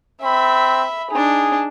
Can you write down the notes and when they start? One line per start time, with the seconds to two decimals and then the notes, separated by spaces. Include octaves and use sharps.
0.22 C4 E5 B5
1.11 D4 D#4 G#4